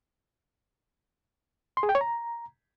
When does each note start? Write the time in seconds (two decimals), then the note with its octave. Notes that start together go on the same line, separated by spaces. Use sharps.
1.77 C6
1.83 G#4
1.89 G5
1.95 C#5
2.01 A#5